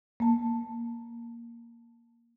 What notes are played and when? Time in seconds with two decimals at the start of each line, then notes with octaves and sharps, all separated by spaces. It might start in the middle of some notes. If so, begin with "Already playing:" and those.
0.20 A#3 A5